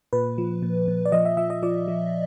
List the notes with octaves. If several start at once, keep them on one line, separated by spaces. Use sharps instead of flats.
A#2 B4
F3
A#2
A#2
D5
F3 D#5
E5
F3 E5
D#5
F3 D5
F3